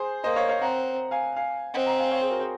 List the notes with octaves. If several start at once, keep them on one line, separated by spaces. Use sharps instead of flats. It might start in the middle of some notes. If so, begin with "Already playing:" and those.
Already playing: G#4 C5
A#3 C5 D#5
C#5 F5
C#5 F5
C4 F#5 A#5
F5 G#5
F5 G#5
C4 D#5 F#5
F#5 A#5
F5 G#5
C#5 F5
G#4 C5
F#4 A#4
G#4 C5